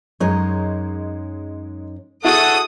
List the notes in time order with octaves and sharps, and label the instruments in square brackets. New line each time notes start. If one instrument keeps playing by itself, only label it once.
[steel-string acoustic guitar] F#2 D#4 C#5 [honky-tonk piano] G#3
[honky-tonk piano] E4 F#4 G#4 [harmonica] A4 F#5 [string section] D#6